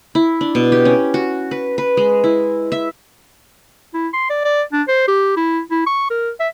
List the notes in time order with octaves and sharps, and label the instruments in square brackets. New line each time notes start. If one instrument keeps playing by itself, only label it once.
[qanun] E4
D4
B2
G4
C#4
F#4
B4
B4
G#3
E4
E5
[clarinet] E4
C6
D5
D5
D4
C5
G4
E4
E4
C#6
A#4
E5